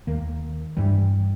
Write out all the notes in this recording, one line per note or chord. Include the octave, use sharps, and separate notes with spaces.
D#2 D#3 A#3
G2 E3 G3